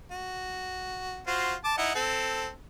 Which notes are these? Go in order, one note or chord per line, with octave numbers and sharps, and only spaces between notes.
F#4
F4 F#4 C5
A5 D6
D#4 E4 F#5
C4 A4